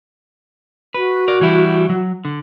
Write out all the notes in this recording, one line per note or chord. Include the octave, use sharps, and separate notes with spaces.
F#4 B4
A#4 D5
E3 G3 E4
F#3
D3